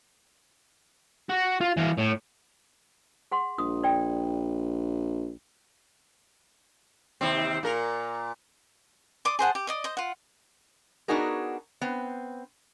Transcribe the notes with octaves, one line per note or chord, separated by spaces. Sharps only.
F#4
F4
E3 F5
A2
G#4 F#5 C6
A#1 D#6
D5 G5
D#2 C3 C4
A#2 A#4
D5 C6 D6 D#6
G#4 C5 F#5 A5
G4
D5 D#5 D#6
C5 D#5
F4 F#5
B3 D4 D#4 F#4 G#4 A#4
B3 C4